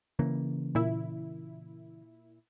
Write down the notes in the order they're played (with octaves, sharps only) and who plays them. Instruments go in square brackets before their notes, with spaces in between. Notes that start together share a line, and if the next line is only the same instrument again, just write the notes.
[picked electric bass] C#3 E3 A#3
[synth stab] A#2 E4